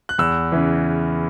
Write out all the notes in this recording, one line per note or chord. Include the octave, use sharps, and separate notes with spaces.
F#6
E2 E6
C#3 E3